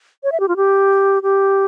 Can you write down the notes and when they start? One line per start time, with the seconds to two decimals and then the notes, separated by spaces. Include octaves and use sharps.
0.24 C#5
0.32 E5
0.40 G4
0.48 F4
0.57 G4
1.23 G4